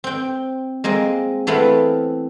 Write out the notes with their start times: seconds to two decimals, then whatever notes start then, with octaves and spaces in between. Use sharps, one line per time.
0.04 C4 G5
0.84 G#3 A#3 C4 D#5
1.47 E3 A3 B3 C4 F5 B5